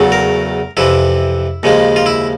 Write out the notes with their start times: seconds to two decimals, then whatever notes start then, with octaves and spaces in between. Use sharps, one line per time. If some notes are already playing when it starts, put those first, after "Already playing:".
Already playing: E2 C#3 F#3 A3
0.12 A#4
0.77 F2 C3 E3 E4
1.63 D#2 C#3 F3 G#3
1.96 F4
2.06 E4